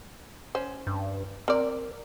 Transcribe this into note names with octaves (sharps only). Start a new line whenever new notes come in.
C#4 C5
G2
C4 A#4 D5